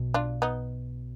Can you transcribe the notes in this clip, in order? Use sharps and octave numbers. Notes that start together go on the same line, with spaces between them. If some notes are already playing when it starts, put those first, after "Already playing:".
Already playing: B1 B2
D4 F4
B3 D#4